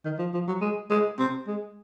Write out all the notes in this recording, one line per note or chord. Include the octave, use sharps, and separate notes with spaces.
D#3
F3
F3
F#3
G#3
G#3
C4
G#3